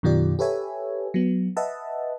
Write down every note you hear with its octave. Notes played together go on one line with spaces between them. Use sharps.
F#2 B2 D#3 F4 G4 D5
G4 A4 B4 C#5 E5 G#5
F#3 B3
B4 D#5 E5 F#5 A5